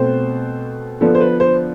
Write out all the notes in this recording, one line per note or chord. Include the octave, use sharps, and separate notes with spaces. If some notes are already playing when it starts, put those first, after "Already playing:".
Already playing: B2 A3 C4 C5
D3 F3 B3 D4 A4
C5
B4
C5